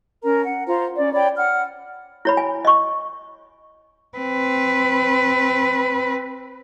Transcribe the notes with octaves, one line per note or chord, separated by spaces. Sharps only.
C#4 A#4 A#5
F#5
F4 C5 A#5
C#4 D5
C#5 D5 G5 B5
F#5 F6
E4 C#5 B5
G#5
D#5 C#6
C4 B4